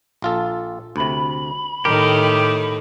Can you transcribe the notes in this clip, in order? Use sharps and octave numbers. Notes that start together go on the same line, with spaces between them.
A#1 F4 A4
D2 C3 B5
A2 D#3 A3 G4 A#4